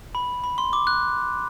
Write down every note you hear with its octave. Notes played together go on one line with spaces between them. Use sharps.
B5
B5
C6
D6
F#6